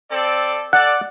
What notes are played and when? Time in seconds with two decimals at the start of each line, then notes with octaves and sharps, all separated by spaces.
0.10 C4 A4 D5
0.73 A4 D5 F#5